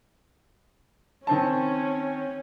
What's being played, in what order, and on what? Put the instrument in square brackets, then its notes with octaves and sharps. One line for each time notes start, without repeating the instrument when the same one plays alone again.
[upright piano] D#3 C4 A5 [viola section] C#4